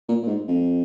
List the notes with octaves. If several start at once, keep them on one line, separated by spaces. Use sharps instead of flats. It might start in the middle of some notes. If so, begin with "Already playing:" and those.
A#2
A#2
G#2
F2